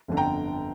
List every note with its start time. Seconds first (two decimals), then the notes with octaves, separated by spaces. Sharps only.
0.08 G1 F2 D3
0.17 G5 A#5